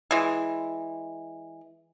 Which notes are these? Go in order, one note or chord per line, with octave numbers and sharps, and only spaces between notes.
E3 G#3